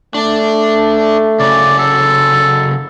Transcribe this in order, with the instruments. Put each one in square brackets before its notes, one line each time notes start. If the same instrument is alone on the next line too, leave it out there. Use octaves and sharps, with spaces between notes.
[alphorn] A3 [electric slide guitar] D4 D5
[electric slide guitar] C#3 F#3 [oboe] D5
[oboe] A4